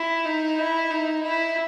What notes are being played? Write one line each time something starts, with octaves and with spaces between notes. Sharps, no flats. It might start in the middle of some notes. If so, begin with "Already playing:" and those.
Already playing: E4
D#4
E4
D#4
E4